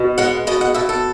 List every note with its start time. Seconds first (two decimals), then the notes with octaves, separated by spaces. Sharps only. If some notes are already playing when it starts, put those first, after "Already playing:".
Already playing: B2
0.18 G#3 F#5
0.47 B2 D#5
0.61 F#5
0.74 B2 E5
0.89 A4